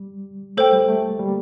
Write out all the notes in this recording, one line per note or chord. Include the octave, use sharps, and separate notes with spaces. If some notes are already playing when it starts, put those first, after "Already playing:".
Already playing: G3
A3 A4 C5 G5
G3
A3
G3 A#3